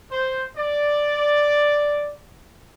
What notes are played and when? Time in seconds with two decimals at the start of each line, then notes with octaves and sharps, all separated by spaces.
0.12 C5
0.57 D5